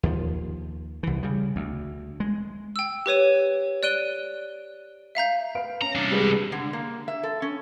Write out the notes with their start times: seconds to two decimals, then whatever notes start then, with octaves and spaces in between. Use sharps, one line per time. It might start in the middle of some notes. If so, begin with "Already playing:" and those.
0.03 D#2 F3
1.03 C2 E3
1.23 C#3 G3
1.56 D2
2.20 G#3
2.76 G5 E6
3.06 G4 B4 C#5 D#7
3.83 D5 F#6 D7 D#7 G7
5.15 E5 F5 A#5 G6
5.55 B4 F5 D7
5.82 C#4 A#5
5.95 C2 D4
6.11 G3 G#3 B4
6.52 D3
6.73 A#3
7.08 E5
7.23 A4
7.42 C#4